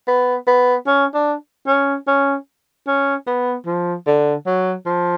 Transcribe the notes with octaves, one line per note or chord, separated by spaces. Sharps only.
B3
B3
C#4
D4
C#4
C#4
C#4
B3
F3
D3
F#3
F3